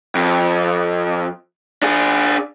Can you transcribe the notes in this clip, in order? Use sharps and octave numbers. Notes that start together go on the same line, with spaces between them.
F2
D4 G#4